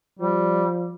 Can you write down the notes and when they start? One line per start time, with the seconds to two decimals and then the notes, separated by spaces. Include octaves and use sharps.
0.19 F3 G3